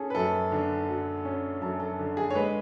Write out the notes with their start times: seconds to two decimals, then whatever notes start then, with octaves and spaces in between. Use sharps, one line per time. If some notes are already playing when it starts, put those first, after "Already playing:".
Already playing: C#4 G#4 A4
0.10 B4
0.15 F#2 A4
0.52 D3
0.89 F#3
1.25 C#4
1.62 F#2 A4
1.80 A4
1.99 D3
2.17 G#4
2.30 C#5
2.35 G#3 B4